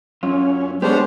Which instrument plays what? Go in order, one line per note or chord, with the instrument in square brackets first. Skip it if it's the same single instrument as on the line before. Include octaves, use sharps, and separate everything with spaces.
[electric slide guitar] F#2 F4 [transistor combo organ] C#4
[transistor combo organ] G#3 B3 [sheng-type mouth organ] D4 C5 [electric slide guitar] G4 A4 C#5